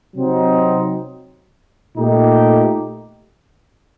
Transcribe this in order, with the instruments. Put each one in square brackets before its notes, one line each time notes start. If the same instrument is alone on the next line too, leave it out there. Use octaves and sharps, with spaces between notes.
[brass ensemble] C3 F#3 C4 D#4
A#2 A3 D#4 G4